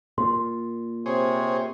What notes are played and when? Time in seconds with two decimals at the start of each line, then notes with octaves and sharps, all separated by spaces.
0.18 A#2 C6
1.06 C3 G#4 C5 C#5